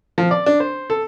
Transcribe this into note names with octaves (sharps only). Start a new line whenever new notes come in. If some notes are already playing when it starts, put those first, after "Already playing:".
F3
D5
D4
C5
A4